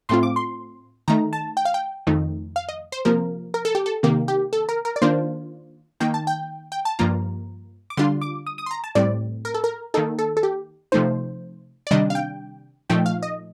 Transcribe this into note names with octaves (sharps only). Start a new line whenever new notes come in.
A2 A3 C4 F4 C6
D6
C6
D#3 A3 D#4 A#5
A5
G5
F5
G5
F2 D#3 A3 D#4
F5
D#5
C5
C3 F3 A#3 A#4
A#4
A4
G4
A4
C3 D#3 A#3 G4
G4
A4
A#4
A#4
D5
D#3 A#3 D4 F4 C5
D#3 A#3 D#4 G5
A5
G5
G5
A5
G2 F3 A#3 F4 A#5
D6
D3 G3 D4 F4 C6
D6
D#6
D#6
C6
A#5
A5
A2 G3 C4 D5
A#4
A4
A#4
D#3 A#3 D#4 A4
A4
A4
G4
C3 F3 A3 D#4 C5
D5
C3 D#3 G3 D4 D#5
F5
G5
A#2 F3 A3 D#4 G5
F5
D#5